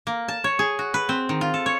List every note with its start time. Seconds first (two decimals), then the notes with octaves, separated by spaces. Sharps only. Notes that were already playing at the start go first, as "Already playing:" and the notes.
0.07 A#3
0.28 A5
0.44 C#5
0.59 G#4
0.79 F#4
0.94 B4
1.09 C4
1.29 D#3
1.41 F4
1.54 A4
1.66 C#5